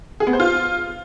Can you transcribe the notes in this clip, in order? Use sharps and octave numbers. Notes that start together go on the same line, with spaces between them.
G#4
B3
C5
F4